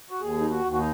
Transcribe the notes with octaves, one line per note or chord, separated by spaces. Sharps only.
F#4
D#2 G#4
D#4
F#4
D#2
F#4
D#4